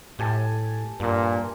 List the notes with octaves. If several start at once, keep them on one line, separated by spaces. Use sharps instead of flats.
A2 G4 G#5 A5
G2 A#2